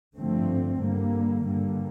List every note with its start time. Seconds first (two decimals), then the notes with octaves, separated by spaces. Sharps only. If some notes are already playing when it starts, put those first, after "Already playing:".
0.17 G2 D3 F3 A3 C4
0.81 G2 D3 G3 A#3
1.44 G2 D3 G3 A#3